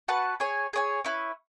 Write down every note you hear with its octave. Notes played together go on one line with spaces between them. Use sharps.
F#4 B4 F#5 A5
G#4 C#5 G#5
G#4 C#5 G#5
C#4 E4 B4